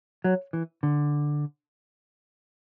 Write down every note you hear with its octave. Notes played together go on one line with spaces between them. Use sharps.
F#3
E3
D3